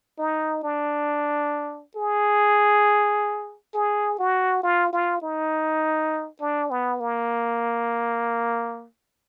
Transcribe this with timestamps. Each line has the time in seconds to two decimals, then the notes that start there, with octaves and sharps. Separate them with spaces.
0.18 D#4
0.63 D4
1.96 G#4
3.74 G#4
4.19 F#4
4.63 F4
4.93 F4
5.22 D#4
6.41 D4
6.71 B3
7.00 A#3